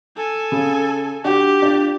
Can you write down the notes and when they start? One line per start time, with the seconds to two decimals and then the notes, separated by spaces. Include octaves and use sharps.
0.17 A4 G#5
0.52 C#3
1.24 D4 F#4 G4
1.62 D4 F4